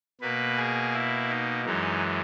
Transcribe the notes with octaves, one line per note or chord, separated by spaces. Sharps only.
B2 A#3 B4
G#4
E4
D#4
F#2 E3 G#3 D#4